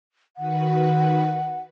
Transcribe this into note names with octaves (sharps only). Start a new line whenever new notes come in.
D#3 F#4 B4 F#5